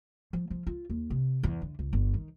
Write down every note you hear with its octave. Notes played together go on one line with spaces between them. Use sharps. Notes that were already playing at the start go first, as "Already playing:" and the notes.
F3
F3
F4
D#2
C3
E2
D3
C#2
G1
D#3